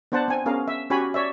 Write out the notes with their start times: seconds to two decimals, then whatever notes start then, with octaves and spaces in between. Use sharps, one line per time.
0.12 B3 D4 C5 F#5 A5
0.28 C4 G#5
0.46 B3 C#4 G#4 A#4 F5
0.68 E5
0.90 C#4 F#4 G4 C#5 G#5 B5
1.14 C#5 D5 E5